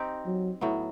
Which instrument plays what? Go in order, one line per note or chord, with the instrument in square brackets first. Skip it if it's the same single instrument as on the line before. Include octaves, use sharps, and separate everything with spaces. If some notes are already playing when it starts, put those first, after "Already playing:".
Already playing: [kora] C4 D#4 G4
[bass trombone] F#3
[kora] A2 F#3 B3